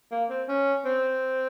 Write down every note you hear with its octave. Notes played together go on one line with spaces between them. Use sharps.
A#3
C4
C#4
C4